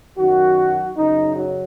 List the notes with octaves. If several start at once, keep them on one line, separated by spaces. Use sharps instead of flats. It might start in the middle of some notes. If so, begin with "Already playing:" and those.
F#2 D#3 F#4
F#2 C#3 D#4
F#3